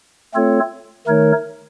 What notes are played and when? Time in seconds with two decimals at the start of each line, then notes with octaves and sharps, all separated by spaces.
0.34 A3 C4 F4 A4 C#5
1.07 D#3 A3 D#4 A#4 C#5